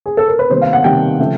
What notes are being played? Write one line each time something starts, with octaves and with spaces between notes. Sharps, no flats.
G#4
A4
A#4
B4
C3 D#3 G3 A#3 C5
F5
F#5
C3 D#3 G3 A#3 G5
C#3 F3 A3